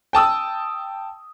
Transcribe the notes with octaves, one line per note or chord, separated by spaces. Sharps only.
G5 A5 D#6 E6